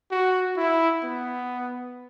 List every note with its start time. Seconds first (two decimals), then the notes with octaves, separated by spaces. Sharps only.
0.11 F#4
0.57 E4
1.04 B3